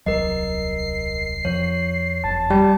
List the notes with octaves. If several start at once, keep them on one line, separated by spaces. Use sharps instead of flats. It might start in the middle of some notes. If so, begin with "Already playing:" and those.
D#1 C2 F#3 A#4 D#5 C7
F2 F3 C#5
F#1 F2 A5
G3 G5